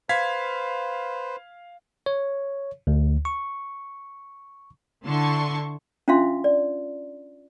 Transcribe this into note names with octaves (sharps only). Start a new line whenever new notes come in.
B4 C5 F5 G#6 B6
C#5
D2
C#6
D3 E4 A5 C6 C#6
C#4 D4 F4 E5 F5 C6
D5